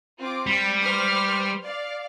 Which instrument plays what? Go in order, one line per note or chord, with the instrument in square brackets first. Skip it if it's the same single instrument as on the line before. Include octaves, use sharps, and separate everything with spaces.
[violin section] C4 F4 D6
[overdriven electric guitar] G3 [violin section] B6 C#7
[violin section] B4 C5 F6
D5 F5